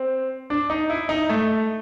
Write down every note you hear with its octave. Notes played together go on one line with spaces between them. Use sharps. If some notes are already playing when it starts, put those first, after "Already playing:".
Already playing: C4
D4
D#4
E4
D#4
A3